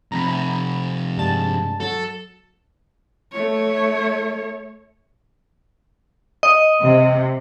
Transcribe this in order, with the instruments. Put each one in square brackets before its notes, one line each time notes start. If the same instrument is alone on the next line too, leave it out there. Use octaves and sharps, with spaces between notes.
[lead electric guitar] F2 C3 [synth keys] A#5 B5
[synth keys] G2 G#3 A5
[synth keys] F#3 [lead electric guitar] A4
[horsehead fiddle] A3 C#5
[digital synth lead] D#5
[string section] C3